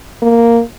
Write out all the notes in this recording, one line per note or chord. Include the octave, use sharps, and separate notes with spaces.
A#3